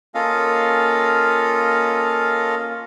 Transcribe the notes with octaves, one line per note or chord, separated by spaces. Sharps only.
A#3 C#4 F4 A4 D#5 F5